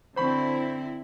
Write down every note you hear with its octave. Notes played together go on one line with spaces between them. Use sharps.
D3 C4 E4 C5 B5 C#6